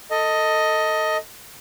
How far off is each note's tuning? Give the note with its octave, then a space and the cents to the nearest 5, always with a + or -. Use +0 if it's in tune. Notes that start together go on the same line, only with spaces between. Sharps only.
A4 +20 D#5 +10